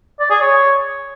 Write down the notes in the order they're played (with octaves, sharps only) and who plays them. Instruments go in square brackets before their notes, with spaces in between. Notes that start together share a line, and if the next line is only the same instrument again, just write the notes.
[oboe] D5
G#4
C#5